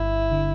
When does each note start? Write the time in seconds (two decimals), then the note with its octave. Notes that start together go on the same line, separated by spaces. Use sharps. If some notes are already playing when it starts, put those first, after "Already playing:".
Already playing: G1 E4
0.31 D3